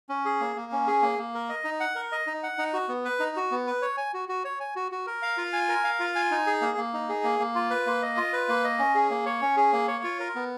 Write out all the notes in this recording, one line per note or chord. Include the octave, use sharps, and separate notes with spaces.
C#4
G#4
A#3
A#3
C#4
G#4
A#3
A#3
A#4
D#5
D#4
F#5
A#4
D#5
D#4
F#5
D#4
F#4
B3
B4
D#4
F#4
B3
B4
C#5
G#5
F#4
F#4
C#5
G#5
F#4
F#4
A#4
F5
F4
G#5
A#4
F5
F4
G#5
D#4
G#4
A#3
A#3
D#4
G#4
A#3
A#3
F4
B4
A#3
D#5
F4
B4
A#3
D#5
C#4
G#4
A#3
C#5
C#4
G#4
A#3
C#5
F4
A#4
B3